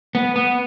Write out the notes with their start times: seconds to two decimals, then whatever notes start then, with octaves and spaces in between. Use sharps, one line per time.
0.15 B3
0.36 B3